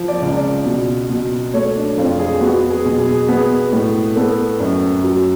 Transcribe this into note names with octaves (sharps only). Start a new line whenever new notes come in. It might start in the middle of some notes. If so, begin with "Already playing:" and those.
Already playing: F3
D5
C#2
D5
B2
B2
A3 C#5
D4
F2 F4
G#4
B3 F#4
G#4
B2
G#4
B3 G#4
A2
B3 A4
F#2
F#3